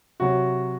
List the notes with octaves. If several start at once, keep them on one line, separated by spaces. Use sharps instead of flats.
C3 F#3 F#4